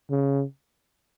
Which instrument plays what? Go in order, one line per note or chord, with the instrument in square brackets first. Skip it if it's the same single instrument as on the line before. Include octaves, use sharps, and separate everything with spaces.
[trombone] C#3